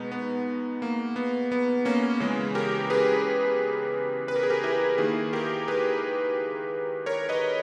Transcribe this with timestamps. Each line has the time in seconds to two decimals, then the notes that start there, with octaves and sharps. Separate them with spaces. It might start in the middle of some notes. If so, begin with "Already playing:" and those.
Already playing: B2 G#3 B3 D#4
0.12 B3
0.82 A#3
1.16 B3
1.52 B3
1.85 A#3 C#4
2.20 C#3 E3 G#3
2.55 G4 A#4
2.90 G#4 B4
4.28 B4
4.36 A#4
4.43 G#4
4.50 G4 A#4
4.63 E4 G#4
4.98 D#3 A#3 E4 G#4
5.33 G4 A#4
5.67 G#4 B4
7.06 A#4 C#5
7.29 B4 D#5